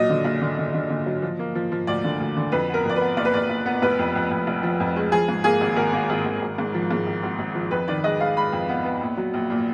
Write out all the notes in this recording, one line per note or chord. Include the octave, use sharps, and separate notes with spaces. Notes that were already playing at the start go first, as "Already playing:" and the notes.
Already playing: A#2 F#3 D#5
D3
F#1
D3
D3
D3
D3
F#3
F3
A#3
F3
F3
D2 D5
D3
D2
D3
F2 B4
B3 A#4
F2 D5
B3 B4
F#1 D5
B4
F#1 D5
F#1
B3
F1 B4
F2
F2
F2
F1
F3
F2
G#3
F3 G#4
G#2
A#3 G#4
G#1
G#1 A#4
A#3
G#1
G#1
G#1
G#2
F3
G#2
G#1
G#1
G#1
F3
F2 B4
D#3 D5
G#3 D#5
G#3 F5
G#3 B5
F2
B3
B3
A#1
F#3
A#1
A#2